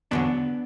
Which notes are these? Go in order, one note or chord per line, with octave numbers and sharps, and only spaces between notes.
E2 D3 F#3 B3 D4